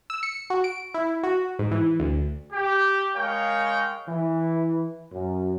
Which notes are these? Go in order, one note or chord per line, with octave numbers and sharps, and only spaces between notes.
E6
C#7
F#4
D7
E4
F#4
G#2
E3
D2
G4
G#3 A#4 C#5 F5 G5
E3
F#2